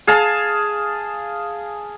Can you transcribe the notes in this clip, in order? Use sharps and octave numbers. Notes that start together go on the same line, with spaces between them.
G#4 F5 A5